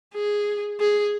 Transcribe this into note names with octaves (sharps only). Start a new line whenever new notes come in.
G#4
G#4